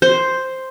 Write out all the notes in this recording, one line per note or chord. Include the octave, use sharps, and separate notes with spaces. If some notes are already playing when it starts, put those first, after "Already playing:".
C5